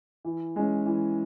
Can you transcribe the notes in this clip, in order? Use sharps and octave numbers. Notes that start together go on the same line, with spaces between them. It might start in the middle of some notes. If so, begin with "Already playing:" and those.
E3
G#3 C#4
E3